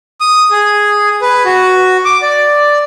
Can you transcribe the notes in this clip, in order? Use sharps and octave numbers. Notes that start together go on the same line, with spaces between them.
D#6
G#4
B4
F#4
D6
D5